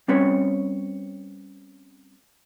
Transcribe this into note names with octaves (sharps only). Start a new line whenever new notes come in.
G3 C4 C#4 B4 C#5